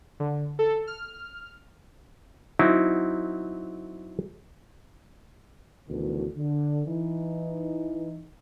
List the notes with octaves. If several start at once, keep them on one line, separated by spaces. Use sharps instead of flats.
D3
A4
F6
F#3 C4 D#4 E4
D2 B2 D#3 E3
D3
E3 D#4